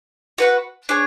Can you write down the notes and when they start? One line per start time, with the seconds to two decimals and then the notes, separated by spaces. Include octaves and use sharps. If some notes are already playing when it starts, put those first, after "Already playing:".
0.38 F#4 B4 F#5
0.89 D4 G#4 C#5